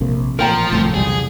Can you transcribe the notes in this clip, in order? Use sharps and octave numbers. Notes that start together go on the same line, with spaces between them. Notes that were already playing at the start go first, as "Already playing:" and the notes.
A#1 C3 A#3
A1 A#2 F3 A#4 G5 A#5
G1 C2 F2 A2 A3
B1 E2 G3 G#4